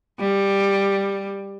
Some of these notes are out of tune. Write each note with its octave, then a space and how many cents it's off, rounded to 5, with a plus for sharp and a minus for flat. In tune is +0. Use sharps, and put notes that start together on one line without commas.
G3 +10